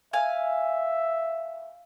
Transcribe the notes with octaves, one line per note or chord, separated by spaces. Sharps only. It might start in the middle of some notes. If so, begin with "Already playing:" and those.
E5 F5 G#5